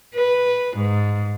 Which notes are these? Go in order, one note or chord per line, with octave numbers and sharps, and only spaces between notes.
B4
G#2